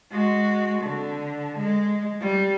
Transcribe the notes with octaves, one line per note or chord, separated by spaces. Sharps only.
G#3 F#4
D3
G#3
G3